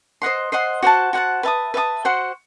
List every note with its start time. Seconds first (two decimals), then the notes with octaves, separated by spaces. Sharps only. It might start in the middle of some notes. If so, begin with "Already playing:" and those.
0.22 C5 D#5 F#5 C6
0.52 C5 D#5 F#5 C6
0.83 F#4 C5 F#5 A5
1.13 F#4 C5 F#5 A5
1.43 B4 E5 A5 D#6
1.74 B4 E5 A5 D#6
2.05 F#4 C5 F#5 C6